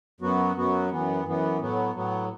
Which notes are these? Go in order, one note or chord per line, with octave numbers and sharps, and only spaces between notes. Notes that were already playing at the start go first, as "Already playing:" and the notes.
F#2 F#3 B3 F#4
F#2 F#3 B3 F#4
F#2 E3 B3
F#2 E3 B3
A2 F#3 B3
A2 F#3 B3